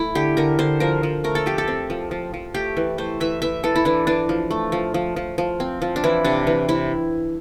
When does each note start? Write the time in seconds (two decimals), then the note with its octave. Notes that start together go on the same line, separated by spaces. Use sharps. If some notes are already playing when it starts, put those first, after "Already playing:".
Already playing: A3 E4
0.15 D3 G4
0.37 D3 A#4
0.59 D3 C5
0.80 F3 A#4
1.03 F3
1.24 A3 A#4
1.35 A4
1.46 F3 G4
1.58 A4
1.68 C4
1.90 F3
2.11 F3
2.34 F3
2.54 A3 G4
2.77 E3
2.98 A3 C5
3.20 E3 E5
3.42 E3 E5
3.63 E3 A4
3.76 E4
3.85 E3 D4
4.07 E3 D4
4.29 F3
4.51 A3
4.72 F3
4.94 F3
5.16 F3
5.38 F3
5.60 C4
5.82 F3
5.96 D4
6.04 E3 E4
6.24 C3 D4
6.47 E3
6.68 C3 E4